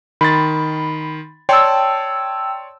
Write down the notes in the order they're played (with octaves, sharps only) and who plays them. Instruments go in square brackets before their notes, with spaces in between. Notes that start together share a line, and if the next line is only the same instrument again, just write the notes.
[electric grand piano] D#3 C6 A6 [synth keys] B5
[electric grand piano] C#5 D5 C6 [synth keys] G5 A5 E6